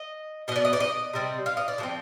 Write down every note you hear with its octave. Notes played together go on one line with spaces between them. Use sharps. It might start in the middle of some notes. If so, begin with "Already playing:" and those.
Already playing: D#5
B2 B3 D5 D#5
D#5
D5
D#5
C3 G3 C4
F5
D#5
D5
D3 F3 C4